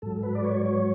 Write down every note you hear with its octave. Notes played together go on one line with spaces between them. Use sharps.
G#2 F#3 A4
B4
D5
C#5
C#5